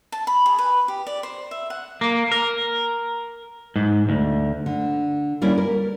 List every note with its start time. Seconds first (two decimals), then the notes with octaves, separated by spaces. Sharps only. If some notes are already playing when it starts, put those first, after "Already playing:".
0.12 A5
0.27 B5
0.46 G#4
0.59 B4
0.88 G4
1.07 D5
1.23 C5
1.51 E5
1.70 F#5
2.01 A#3
2.32 A#4
3.76 G#2
4.09 D2
4.66 D3
5.42 G3 A#3 C#4 E4
5.58 A#4